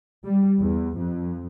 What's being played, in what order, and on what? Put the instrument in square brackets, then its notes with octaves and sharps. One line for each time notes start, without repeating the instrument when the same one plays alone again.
[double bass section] G3
E2
F2